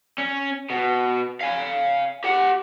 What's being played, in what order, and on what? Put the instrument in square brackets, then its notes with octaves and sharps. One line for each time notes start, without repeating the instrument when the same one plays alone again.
[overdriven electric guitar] C#4
B2
F5 G#5
G4 F#5